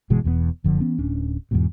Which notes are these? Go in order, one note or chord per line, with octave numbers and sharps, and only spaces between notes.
G1 B2 E3 G#3
E1 E2 G2 B3
F#1 D3 F3
E3 B3 C#4
D1 C#4 D4
E2 G#2 B2